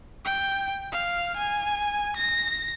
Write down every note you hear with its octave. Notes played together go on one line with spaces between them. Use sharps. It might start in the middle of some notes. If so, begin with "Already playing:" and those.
G5
F5
G#5
A#6